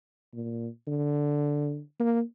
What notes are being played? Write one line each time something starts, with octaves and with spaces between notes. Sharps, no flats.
A#2
D3
A#3